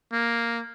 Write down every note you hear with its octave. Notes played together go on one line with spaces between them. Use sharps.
A#3